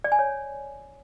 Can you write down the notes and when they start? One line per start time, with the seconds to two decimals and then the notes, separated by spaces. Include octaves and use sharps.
0.04 D5
0.12 G#5
0.19 C#5